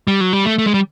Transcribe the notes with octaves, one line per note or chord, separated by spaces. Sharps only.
G3
F#3
G3
A3
A3
G#3
G3